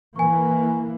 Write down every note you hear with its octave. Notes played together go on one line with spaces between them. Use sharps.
E3 A#3 G#5 C#6